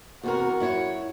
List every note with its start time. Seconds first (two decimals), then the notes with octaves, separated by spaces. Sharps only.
0.23 E2 C3 F#4 A#4
0.60 F#2 E4 C#5